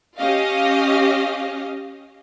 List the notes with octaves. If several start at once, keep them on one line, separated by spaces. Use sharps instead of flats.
C#4 G4 D#5 F5